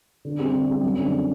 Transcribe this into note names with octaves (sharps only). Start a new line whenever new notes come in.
D3
G3 C4 G4
D3
G3 C4 G4
F#2
D3 G3 C4